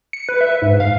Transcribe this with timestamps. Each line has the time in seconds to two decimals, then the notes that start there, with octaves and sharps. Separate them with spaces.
0.13 C#7
0.29 B4
0.41 E5
0.62 G#2
0.80 F5